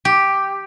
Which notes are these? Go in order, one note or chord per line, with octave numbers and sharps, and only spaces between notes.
G4